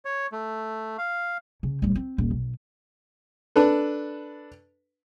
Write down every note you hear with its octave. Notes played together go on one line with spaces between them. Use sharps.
C#5
A3
F5
C#3
D1 G3
C4
D#1
B1
D4 A4 B4